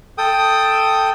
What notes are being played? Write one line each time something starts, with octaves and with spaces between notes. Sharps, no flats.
A4 G5 D#6